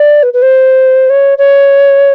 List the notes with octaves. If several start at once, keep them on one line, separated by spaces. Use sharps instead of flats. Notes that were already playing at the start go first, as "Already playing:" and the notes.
Already playing: D5
B4
B4
C5
C#5
C#5